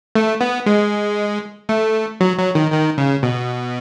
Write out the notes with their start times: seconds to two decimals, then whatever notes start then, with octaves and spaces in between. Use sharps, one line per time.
0.15 A3
0.41 B3
0.66 G#3
1.69 A3
2.21 F#3
2.38 F#3
2.55 D#3
2.72 D#3
2.98 C#3
3.23 B2